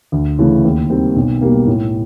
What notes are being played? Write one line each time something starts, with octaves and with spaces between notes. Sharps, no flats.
D2
C#3 E3 A3
D#2
D#3 G3 C4
B1
B2 G3 A#3
A2